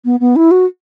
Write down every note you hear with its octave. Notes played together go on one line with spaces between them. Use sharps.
B3
B3
E4
F#4